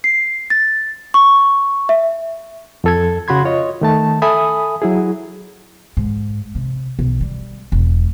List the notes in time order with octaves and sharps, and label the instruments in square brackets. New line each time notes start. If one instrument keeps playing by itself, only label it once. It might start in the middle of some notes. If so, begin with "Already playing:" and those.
[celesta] C7
A6
C#6
E5
[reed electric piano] F2 A4 G#6
C#3 F#4 B5 C6 G#6
F4 C#5 D#5
D#3 A3 A5
A4 E5 G#5 B5 D#6
F#3 E4 G#4
[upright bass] G#2
C3
B1
G3
E1